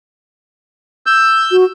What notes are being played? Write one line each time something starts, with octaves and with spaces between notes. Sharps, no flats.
E6 G6
F#4